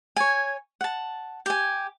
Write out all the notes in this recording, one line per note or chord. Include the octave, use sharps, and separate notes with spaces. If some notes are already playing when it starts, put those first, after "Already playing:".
C#5 G#5
F#5 A5
G4 G#5